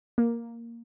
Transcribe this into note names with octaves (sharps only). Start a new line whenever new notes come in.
A#3